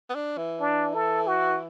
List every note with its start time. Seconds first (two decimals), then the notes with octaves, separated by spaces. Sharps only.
0.10 B3
0.15 D4
0.37 E3
0.60 D4
0.94 A4
1.27 F#4